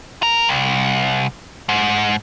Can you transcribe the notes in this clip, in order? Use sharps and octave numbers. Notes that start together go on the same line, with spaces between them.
A#4
C2
G#2